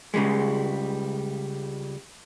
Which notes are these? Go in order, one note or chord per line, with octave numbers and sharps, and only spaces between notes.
C#2 C#3 E3 G3 G#3